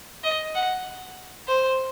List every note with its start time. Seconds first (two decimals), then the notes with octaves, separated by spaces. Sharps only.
0.24 D#5
0.55 F#5
1.48 C5